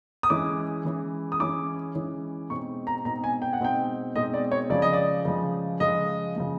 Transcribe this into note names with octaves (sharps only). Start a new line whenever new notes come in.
D#6
E3 G#3 C#4 E4 D6
E3 G#3 C#4 E4
D#6
E3 G#3 C#4 E4 D6
E3 G#3 C#4 E4
B2 G#3 C4 D#4 C#6
A#5
B2 G#3 C4 D#4 A#5
G#5
G5
F#5
B2 G#3 C4 D#4 G5
B2 G#3 C4 D#4 D#5
D5
C#5
C#3 F3 G#3 D5
D#5
D5
C#3 F3 G#3
C#3 F3 G#3 D#5
C#3 F3 G#3